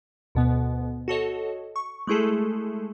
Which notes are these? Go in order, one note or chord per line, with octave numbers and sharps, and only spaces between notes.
D2 B2 B3
F#4 A4 C#5 D#5
C#6
G#3 A3 E4 G#4 A4